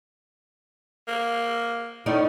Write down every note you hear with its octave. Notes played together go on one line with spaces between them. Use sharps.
A#3
A2 C#4 D#4 D5